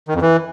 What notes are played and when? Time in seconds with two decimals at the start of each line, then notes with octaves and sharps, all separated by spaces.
0.08 D#3
0.15 F2
0.21 E3